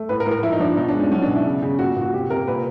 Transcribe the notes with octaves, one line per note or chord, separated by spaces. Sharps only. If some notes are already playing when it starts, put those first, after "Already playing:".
Already playing: A3
A2 B4
A#4
A2
A#4
F3 E4
D#4
F3 D4
B2 D#4
D4
G#3
C#4
F#3 C#4
D4
B2
E4
C#3
C#3
A#2 F#4
A#2
F#4
C3 G4
C3 A#4
A#2 B4